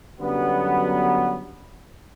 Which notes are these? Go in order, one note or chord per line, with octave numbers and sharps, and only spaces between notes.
F#2 D3 F#3 G3 B3